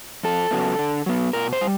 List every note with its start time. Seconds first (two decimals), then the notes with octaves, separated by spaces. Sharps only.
0.23 F2 A4
0.51 C#3 F#3 B3
0.79 D3
1.06 F#3 B3
1.33 B2 A#4
1.53 C5
1.61 G3